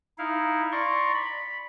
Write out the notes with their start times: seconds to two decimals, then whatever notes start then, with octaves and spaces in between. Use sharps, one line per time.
0.18 D#4 E4 F5
0.72 D5 A#5 C6 C#6
1.14 B5